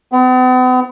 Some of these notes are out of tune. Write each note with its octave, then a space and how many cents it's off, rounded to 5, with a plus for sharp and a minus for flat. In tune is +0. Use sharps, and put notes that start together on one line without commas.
B3 +45